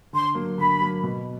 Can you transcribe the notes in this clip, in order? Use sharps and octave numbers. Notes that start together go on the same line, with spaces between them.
D3 C6
F#3 A#3
D3 B5
F#3 A#3
B2